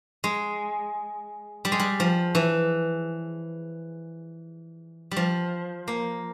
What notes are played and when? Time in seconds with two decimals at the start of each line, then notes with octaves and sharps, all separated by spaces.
0.24 G#3
1.65 G3
1.72 G#3
1.80 G3
2.00 F3
2.35 E3
5.11 G3
5.16 F3
5.88 A#3